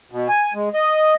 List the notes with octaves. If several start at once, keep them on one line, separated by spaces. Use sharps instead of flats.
B2
G#5
G#3
D#5